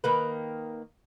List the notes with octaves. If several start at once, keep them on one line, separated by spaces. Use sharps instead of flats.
D#3 A#3 B4